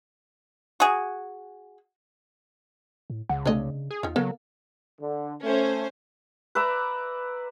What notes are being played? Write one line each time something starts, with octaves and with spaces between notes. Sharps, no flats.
F#4 G#4
A2
C#2 C#3 F#5
C3 A3 D4 C#5 D#5
G#4
E2 D#4 F4
C#3 F#3 A#3 B3 A4
D3
A3 C#4 C5
B4 D5 E5 A#5